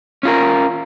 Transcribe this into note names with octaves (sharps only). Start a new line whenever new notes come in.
C#4 F4 A#4